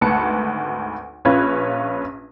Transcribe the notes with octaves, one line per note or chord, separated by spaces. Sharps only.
G#1 D2 B4 A5 C#7
A#1 C#4 F4 B4 G#6